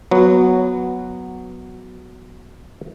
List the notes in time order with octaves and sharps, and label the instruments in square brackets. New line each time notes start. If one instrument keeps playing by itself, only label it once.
[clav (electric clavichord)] F#3 B3 F#4